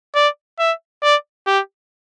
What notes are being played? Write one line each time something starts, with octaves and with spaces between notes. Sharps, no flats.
D5
E5
D5
G4